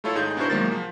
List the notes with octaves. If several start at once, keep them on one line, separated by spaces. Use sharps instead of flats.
A3 E4 F4 A4 C#5
G#1 D#4 G#4 G6
B3 D4 E4 F#4 A#4 C5
C2 D#3 F#3 G#3 A#3 A6
F3